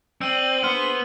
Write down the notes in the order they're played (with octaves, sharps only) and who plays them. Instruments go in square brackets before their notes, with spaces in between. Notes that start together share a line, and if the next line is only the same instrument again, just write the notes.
[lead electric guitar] C4 [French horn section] D5 [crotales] E6 D#7 F#7
[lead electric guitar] B3 [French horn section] D4 G#4 [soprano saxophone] C5 [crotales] F6